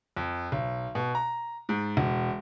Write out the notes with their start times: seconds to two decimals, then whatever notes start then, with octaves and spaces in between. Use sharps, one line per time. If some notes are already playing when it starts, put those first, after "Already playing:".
0.17 F2
0.52 B1
0.95 B2
1.15 A#5
1.69 G#2
1.97 E1